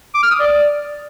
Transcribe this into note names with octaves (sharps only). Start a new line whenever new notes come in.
D6
F6
D#6
D5